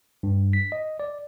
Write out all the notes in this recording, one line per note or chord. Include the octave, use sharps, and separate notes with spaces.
G2
B6
D#5
D5